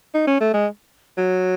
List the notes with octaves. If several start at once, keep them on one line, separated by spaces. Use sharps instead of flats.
D#4
C#4
A3
G#3
F#3